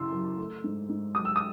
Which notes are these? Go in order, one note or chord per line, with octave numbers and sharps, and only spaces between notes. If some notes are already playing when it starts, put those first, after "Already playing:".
Already playing: F#2 C#3 E3 C6 E6
F#2
A3
G#2
G#2
F#3 D#6
E6
D#6